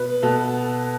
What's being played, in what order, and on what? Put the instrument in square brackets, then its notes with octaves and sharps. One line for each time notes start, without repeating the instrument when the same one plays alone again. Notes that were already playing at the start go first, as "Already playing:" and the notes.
Already playing: [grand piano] B2 B4
B2 A4